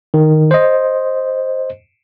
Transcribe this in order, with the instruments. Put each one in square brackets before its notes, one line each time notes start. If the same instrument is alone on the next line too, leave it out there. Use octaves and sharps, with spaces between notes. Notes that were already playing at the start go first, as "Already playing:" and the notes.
[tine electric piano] D#3
C5 D#5